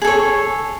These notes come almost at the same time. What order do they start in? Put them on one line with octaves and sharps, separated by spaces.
G#4 A4 C#5